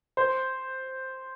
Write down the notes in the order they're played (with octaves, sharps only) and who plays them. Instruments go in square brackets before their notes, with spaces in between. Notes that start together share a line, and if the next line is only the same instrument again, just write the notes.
[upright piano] C5